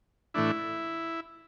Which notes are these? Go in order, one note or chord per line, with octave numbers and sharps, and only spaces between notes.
A2 E3 A3 D4 E4